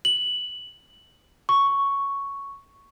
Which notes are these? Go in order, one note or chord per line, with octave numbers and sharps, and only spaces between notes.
F#7
C#6